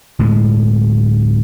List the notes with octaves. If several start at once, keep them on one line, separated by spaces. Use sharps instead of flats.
D1 A2 G#3